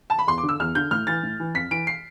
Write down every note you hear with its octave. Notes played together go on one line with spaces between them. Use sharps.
A5
B5
E2 C6
D6
D3
E6
E2 F6
D3 G6
A2 F6
E3 A6
A2
E3
F2 B6
E3 D7
C7